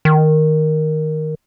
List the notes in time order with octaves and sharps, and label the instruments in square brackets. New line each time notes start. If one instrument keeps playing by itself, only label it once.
[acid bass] D#3